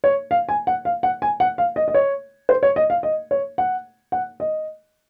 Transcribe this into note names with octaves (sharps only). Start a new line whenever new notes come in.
C#5
F5
G#5
F#5
F5
F#5
G#5
F#5
F5
D#5
D#5
C#5
C5
C#5
D#5
F5
D#5
C#5
F#5
F#5
D#5